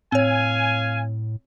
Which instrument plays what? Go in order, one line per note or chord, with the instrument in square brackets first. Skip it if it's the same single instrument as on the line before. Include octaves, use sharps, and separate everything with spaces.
[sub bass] A2 [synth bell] C4 C#5 [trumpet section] F5 G#5